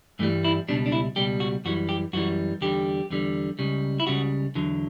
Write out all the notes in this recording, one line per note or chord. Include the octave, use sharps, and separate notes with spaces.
G2 E3 G3 A3
E4
C#2 B2 G3 D4
D4
E4
C#2 B2 G3 G4
F#4
F#2 E3 G3 F#4
G4
F#2 E3 G3 F#4
E2 D3 G3 G4
E2 D3 G3
C#2 C#3 G3
E4
C#2 C#3 G3 F#4
E2 D3 F#3